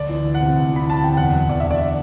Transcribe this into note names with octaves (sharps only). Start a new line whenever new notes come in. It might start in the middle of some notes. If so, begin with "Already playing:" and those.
Already playing: D2 D5
E3
D2
F#5
C3
D2
E3 B5
D2 A5
C3 G5
E2 F#5
F#3
E2 D5
D3 E5
D5